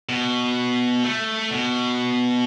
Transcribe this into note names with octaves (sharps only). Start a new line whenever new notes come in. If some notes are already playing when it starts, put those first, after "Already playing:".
B2
A3
B2